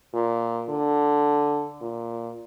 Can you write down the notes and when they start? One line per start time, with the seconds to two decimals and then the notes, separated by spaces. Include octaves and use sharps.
0.14 A#2
0.70 D3
1.81 A#2